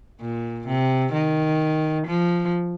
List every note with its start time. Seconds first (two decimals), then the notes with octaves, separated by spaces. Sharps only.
0.21 A#2
0.67 C3
1.13 D#3
2.07 F3